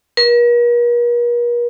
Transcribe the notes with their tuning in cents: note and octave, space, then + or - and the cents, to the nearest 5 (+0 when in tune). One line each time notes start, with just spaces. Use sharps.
A#4 +45